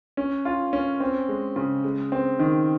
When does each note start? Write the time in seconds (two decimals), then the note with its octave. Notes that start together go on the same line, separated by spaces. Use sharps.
0.17 C#4
0.45 F4
0.73 C#4
1.00 C4
1.29 G#3
1.56 C#3
1.84 G#3
2.12 C4
2.39 D#3